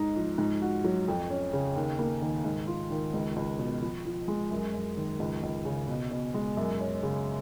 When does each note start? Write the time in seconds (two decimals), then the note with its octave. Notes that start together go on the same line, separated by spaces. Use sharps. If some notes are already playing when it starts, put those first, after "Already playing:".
Already playing: G#2 D#4
0.16 F3
0.38 G#2
0.62 F#4
0.84 F#3
1.08 F2
1.30 C#4
1.53 C#3
1.76 D#2
1.99 A#3
2.22 D#3
2.44 G#2
2.67 F4
2.91 D#3
3.14 C#2
3.36 C#2
3.59 B2
3.82 F3
4.05 F3
4.28 G#3
4.51 F#2
4.74 F#2
4.97 D#3
5.20 C#2
5.43 C#2
5.65 C#3
5.88 B2
6.11 B2
6.34 G#3
6.57 F#2
6.80 C#4
7.03 C#3